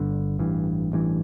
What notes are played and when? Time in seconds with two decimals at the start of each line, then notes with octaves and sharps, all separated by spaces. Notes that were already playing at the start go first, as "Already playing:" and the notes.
Already playing: G1 G2 D3
0.39 A1 G2 E3
0.92 A1 G2 E3